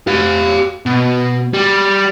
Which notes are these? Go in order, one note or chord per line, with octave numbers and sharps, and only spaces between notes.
G4 F5
B2
G3